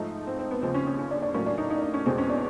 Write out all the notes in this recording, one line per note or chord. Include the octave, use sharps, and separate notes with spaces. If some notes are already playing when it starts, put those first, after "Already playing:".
Already playing: G#2 F3 A3 D#4
C4
C4
B3
D#2 C#3 F3 C4
C#4
C#4
C#4
D4
D4
A2 F#3 A#3 C#4
D4
D#4
D#4
D4
C#4
E2 B2 G#3 C4
C#4
D4